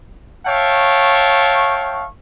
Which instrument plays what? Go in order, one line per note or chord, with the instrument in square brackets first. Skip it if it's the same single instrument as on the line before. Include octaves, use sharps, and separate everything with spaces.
[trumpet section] C#5 E5 F5 G5 A5 C#6